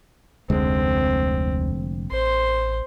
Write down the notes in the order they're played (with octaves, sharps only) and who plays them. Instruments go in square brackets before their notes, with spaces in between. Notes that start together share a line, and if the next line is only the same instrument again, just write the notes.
[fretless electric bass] F1 D3 G#3 [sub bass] D2 [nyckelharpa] C4
[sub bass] A1 [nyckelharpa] C5 C6